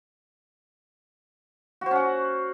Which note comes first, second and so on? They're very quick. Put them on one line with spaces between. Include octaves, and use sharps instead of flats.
F#4 C5 C#4 F#5